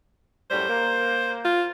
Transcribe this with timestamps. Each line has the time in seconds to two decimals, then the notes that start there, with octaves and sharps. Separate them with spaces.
0.50 F#2 A2 G3 C5
0.68 A#3
1.45 F4